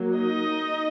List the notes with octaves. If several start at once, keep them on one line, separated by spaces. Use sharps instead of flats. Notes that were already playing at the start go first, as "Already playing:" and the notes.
Already playing: F#3 A#3
D#4 D#5